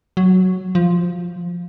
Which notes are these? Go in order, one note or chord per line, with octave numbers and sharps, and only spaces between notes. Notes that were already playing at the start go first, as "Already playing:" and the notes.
F#3
F3